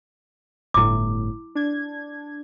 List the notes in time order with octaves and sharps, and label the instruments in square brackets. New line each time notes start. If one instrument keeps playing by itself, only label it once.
[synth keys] G1 A2 [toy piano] E4 D6
[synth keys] D4 G#6